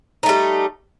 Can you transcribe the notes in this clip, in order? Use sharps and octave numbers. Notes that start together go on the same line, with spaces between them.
G3 A3 D#4